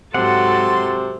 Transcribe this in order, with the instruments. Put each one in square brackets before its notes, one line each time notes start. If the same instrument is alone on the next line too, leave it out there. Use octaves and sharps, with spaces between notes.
[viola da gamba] G#2 F#3 A4 [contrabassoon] C3 [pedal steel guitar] F#5 [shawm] C6